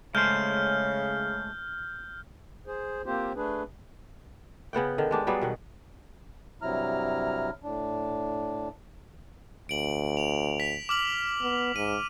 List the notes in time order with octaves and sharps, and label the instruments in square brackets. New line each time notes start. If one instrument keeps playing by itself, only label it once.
[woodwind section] C#3 [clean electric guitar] G#3 A3 C5 [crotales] F6 G6
[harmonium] G#4 C5
A#3 C4 F4 G4 C5
A3 D4 G#4 B4
[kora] C#3 B3 F#5 G5
D3 D#3
G#3 D4 G4
F#3 G3 B3 G#4
B2 D#3 F#5
[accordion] G2 C3 F#3 E4 A#5 F6
A2 D4
[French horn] D2 [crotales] D7 F#7
[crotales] F7
B6 F7
D6 F6 F#7
[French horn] B3
[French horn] G#2 [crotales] D#7